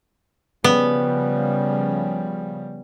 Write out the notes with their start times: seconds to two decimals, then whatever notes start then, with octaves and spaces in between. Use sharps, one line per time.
0.64 C#3 F3 G3 B3